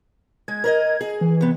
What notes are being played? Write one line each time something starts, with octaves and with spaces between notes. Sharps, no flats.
G#3 G#6
A#4 B4 D#5
G#4
E3
C3 B3